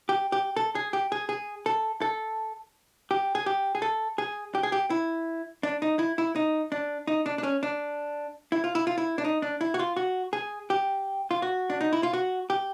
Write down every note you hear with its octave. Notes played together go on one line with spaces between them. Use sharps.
G4
G4
A4
G#4
G4
G#4
G#4
A4
A4
G4
G#4
G4
G#4
A4
G#4
G4
G#4
G4
E4
D4
D#4
E4
E4
D#4
D4
D#4
D4
D4
C#4
D4
E4
F4
E4
F4
E4
D4
D#4
D4
E4
F#4
F4
F#4
G#4
G4
F4
F#4
D4
D#4
E4
F4
F#4
G4